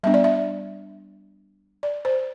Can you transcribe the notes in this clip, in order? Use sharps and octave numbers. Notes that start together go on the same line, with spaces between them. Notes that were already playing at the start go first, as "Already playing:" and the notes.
G3 B3 D4 E5
D5
E5
D5
C5